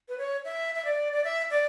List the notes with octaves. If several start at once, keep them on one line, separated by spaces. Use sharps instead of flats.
B4
C#5
E5
E5
D5
D5
E5
D5